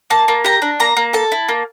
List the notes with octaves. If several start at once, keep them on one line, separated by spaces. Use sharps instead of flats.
A#3 A5
A#3
G4 A#5
D4
A#3 A#5
A#3
A4 A5
E4
A#3